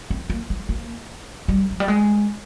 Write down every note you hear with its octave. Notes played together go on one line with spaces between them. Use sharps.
C4
A#3
G#3
A#3
G3
F3
G3
G#3